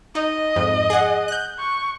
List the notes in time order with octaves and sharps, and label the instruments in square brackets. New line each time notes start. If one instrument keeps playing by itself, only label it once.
[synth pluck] D#4 [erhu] D#5
[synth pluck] F2 G#2
G#4 F#5
F#6 G6
[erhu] C#6